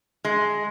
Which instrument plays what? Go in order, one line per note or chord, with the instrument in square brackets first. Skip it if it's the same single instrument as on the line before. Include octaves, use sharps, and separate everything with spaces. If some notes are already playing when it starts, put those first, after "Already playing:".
[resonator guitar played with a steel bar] G#3